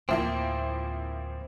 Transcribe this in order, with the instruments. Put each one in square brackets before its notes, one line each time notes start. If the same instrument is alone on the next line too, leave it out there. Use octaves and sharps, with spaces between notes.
[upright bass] D2 A2 [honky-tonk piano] E3 F3 A#3 [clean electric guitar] C4